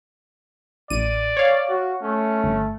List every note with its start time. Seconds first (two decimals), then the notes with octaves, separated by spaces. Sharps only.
0.90 A1 D5 D#7
1.37 C#5 F5
1.69 F#4
2.02 A3 C#4
2.44 G1